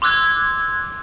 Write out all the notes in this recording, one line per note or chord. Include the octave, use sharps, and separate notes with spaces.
C6 D6 E6 F#6 G#6